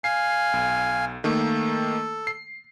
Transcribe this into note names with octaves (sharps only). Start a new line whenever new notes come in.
F5 G#5 C7
B1
D#3 A3 A#3 A4
C7